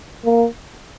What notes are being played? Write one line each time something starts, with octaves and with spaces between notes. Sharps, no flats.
A#3